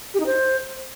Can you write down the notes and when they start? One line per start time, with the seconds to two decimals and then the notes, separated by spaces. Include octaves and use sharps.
0.14 G4
0.20 D#4
0.26 C5